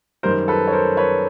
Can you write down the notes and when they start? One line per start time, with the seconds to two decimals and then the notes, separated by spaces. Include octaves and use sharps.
0.23 F#2 D#3 G3 A#4 C5
0.48 A4 B4
0.67 C#5
0.73 A#4 C5
0.97 B4 C#5